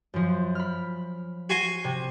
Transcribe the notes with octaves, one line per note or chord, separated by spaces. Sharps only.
F#2 F3
B5 F6
F#4 G#5 C6
C3